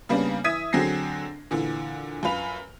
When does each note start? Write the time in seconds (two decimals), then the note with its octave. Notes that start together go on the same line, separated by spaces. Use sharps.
0.09 C#3 G3 A#3 B3 C#4 D4
0.44 E3 E5 D#6 G#6 B6 D#7
0.73 D3 F#3 C4 G#4 A#6 C7
1.51 A#2 D3 E3
2.23 F#2 F4 B4 F7